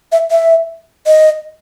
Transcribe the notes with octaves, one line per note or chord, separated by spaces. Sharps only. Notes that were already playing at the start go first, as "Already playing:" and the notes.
E5
E5
D#5